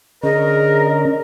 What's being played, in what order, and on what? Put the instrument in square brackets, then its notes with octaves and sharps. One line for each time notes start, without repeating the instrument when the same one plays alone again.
[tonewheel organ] D3 C#4 [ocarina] G#4 [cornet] A#4 [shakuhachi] D#5